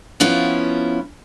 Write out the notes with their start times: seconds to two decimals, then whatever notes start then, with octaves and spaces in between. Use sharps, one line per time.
0.20 F3 B3 C#4 E4 F4